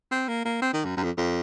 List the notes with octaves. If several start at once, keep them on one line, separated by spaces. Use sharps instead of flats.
C4
A#3
A#3
C4
D#3
F#2
F#2
F2
F2